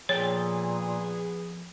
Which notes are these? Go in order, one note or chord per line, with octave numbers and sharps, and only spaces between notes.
A#2 F3 B3 G#4 A4 C#5 G5